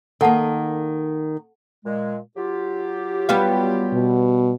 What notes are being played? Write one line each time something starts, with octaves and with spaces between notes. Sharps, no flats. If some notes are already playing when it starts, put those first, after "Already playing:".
D#3 A#3 A4 F#5 A5
A#2 G#3
F#3 F4 G4
G3 B3 F5
B2